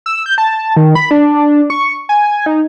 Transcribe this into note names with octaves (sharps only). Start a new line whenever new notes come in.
E6
G6
A5
D#3
B5
D4
C#6
G#5
D#4